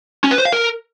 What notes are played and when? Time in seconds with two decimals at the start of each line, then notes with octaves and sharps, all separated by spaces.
0.24 C#4
0.31 B4
0.38 C5
0.45 F5
0.52 A#4